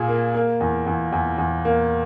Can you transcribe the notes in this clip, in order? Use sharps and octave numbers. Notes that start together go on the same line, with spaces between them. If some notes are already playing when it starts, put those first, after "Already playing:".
Already playing: A#2 G#4
A#3
A#3
E2
E2
E2
E2
A#3